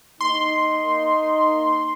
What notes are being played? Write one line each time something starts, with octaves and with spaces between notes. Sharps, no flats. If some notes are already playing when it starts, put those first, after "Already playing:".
A#3 D#4 C6